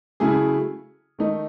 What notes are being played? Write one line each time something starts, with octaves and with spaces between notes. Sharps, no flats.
C#3 F#3 A3 E4 G#4
D#3 A3 D#4